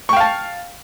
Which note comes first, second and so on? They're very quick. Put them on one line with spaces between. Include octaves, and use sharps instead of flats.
C#6 G5 F5 A5